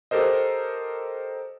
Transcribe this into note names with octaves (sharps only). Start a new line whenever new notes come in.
G4 A4 A#4 C5 D#5